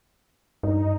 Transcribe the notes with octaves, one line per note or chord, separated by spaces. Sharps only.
G2 D#4